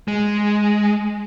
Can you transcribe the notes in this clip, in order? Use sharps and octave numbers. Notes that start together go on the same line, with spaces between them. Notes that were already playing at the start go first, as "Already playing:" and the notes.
G#3